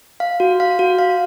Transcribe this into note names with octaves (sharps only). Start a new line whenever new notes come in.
F5
F#4
F5
F#4
F5